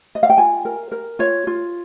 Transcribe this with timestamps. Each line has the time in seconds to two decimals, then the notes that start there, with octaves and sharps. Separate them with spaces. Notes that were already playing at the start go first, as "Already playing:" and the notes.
0.15 D#5
0.23 F5
0.30 G5
0.38 F4 G#5
0.65 A#4
0.92 A#4
1.19 F4 C#5
1.47 F4